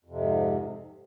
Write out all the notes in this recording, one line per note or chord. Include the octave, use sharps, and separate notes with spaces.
F2 G#2 C3